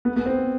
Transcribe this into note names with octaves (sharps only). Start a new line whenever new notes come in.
B3
B3
C4